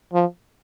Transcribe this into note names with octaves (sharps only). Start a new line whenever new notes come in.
F3